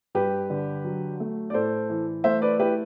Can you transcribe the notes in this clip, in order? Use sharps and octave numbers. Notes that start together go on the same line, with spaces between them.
G2 G4 B4
D3
F#3
A3
D5
A2 A4 C5
E3
A3 C5 E5
B4 D5
E4 G4 B4